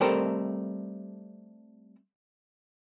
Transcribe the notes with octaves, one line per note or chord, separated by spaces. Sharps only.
G3 A3 C4 A4 A#4 D#5